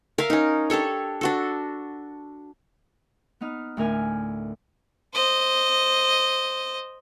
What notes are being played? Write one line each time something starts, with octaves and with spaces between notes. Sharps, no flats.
A#4 E5 F5
C#4 D#4
D4 G4 A4 C#5
D4 F#4 A4
B3 D#4 F6
D2 A2 A#4 G#5 F6
C5 D#5